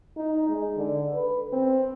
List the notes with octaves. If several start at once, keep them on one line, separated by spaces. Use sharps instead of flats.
D#4
G#3
D3
B4
C4